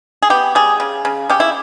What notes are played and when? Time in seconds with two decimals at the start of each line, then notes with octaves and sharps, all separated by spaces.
0.22 G#4
0.30 B3 G4
0.55 G3 G#4
0.80 C#3
1.05 C#3
1.29 C#3 G4
1.40 E4